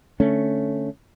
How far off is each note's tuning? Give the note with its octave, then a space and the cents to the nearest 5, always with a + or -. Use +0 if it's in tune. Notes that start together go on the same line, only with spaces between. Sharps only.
D3 +0 A3 +0 C#4 +0